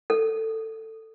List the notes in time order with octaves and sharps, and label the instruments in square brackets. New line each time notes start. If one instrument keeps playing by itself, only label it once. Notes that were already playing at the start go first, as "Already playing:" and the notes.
[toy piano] A4